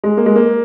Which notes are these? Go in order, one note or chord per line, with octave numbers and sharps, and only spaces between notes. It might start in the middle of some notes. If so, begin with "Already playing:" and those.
G#3
A#3
G#3
A#3